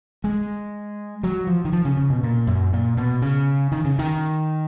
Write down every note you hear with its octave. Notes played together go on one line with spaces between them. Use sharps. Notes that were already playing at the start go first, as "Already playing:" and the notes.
G#3
F#3
F3
D#3
F3
C#3
C#3
B2
A#2
F#2
A#2
B2
C#3
D#3
C#3
D#3